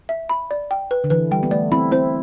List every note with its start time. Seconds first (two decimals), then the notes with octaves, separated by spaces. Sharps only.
0.09 E5
0.29 B5
0.51 D5
0.71 G5
0.91 B4
1.04 D3
1.10 E3 B4
1.31 G3 G5
1.43 B3
1.51 A3 D5
1.72 C4 E4 B5
1.91 C4 E4 C5